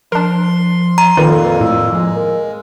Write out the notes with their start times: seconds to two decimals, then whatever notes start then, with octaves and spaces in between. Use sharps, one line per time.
0.12 F3 D4 A#4 C6
0.98 A#5
1.17 F2 A#2 D#3 A#3 F4 A4 B4
1.61 A2 E6
1.92 F3 G#3
2.16 A#4